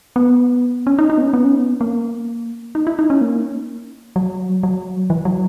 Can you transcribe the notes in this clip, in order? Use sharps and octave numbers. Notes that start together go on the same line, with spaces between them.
B3
C#4
D#4
D#4
B3
C#4
B3
C#4
B3
A#3
D#4
E4
D#4
C#4
A#3
F#3
F#3
E3
F#3